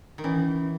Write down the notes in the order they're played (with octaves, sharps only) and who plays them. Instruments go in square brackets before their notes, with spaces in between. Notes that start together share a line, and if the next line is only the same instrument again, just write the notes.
[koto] D#3
[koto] E3 [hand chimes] C#4